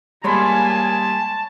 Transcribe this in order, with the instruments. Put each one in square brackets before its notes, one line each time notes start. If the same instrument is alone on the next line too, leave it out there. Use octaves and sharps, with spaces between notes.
[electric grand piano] G3 G#3 [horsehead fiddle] A#3 G#5 [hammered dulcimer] C#5 B5 C6 [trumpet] A5